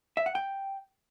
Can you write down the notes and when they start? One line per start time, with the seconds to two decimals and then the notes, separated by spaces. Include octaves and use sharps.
0.17 E5
0.26 F#5
0.35 G5